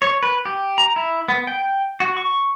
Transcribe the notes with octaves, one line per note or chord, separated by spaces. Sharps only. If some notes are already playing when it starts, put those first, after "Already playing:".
C#5
B4
G4
A#5
E4
B3
G5
F#4
C#6